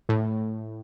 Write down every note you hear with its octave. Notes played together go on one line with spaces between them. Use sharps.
A2